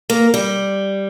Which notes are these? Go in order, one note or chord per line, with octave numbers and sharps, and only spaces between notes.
A#3
G3